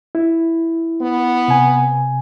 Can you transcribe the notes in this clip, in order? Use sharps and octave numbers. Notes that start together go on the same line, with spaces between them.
E4
B3
C3 G#5